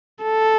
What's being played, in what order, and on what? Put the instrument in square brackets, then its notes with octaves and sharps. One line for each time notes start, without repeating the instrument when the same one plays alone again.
[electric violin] A4